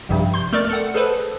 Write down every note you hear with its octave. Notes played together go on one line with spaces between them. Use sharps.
A#1 G2 C3
C6 G6
A3 A#4 D5
A4 F#5
G#4 A4 B4 C5